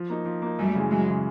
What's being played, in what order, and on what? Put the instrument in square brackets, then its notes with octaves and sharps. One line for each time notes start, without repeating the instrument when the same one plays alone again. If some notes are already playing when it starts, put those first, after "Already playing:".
Already playing: [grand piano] F3
A#3 D#4
F3
A#3 D#4
[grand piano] F#2 [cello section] G3 A3
[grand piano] C#3 E3 G#3
[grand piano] F#2 [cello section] F#3 G#3
[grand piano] C#3 E3 G#3